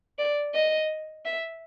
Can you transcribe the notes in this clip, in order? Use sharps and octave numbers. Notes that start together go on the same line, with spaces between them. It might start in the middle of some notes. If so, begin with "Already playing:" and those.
D5
D#5
E5